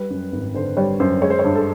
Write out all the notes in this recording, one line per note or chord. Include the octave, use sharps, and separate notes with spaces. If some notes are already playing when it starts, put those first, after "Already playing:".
Already playing: G3 B4
F#2
G#1
D3 C5
G3 C#5
F#2 C5
G#3 C#5
C5
C#5
G2
A4